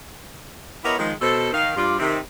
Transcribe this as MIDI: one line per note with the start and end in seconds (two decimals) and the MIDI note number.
0.84 0.96 59
0.84 0.96 64
0.84 0.96 67
0.84 0.96 70
0.84 0.96 73
0.84 0.96 75
0.98 1.12 51
0.98 1.12 53
0.98 1.12 56
1.21 1.48 47
1.21 1.48 69
1.21 1.48 72
1.52 1.73 51
1.52 1.73 77
1.76 1.97 43
1.76 1.97 65
1.76 1.97 74
1.99 2.19 48
1.99 2.19 51